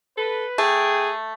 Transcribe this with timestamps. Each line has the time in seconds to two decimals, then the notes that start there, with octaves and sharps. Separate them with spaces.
0.17 A4 B4
0.58 A3 G#4 G5